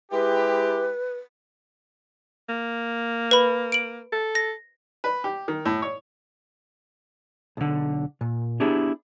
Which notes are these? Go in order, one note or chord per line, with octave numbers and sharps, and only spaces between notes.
G#3 E4 G4 B4
A#3
B4 B5
D7 F#7
A4
A#6
B4
G4
D#3
A2
C#5
B1 D3
A#2
B3 D4 E4 G4 G#4